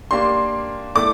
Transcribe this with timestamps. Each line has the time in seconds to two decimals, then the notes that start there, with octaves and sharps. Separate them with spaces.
0.11 A#3 D4 G4 C6
0.95 A3 E4 A4 D5 D6